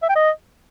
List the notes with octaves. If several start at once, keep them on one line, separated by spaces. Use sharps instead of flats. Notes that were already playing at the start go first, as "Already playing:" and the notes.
E5
G5
D#5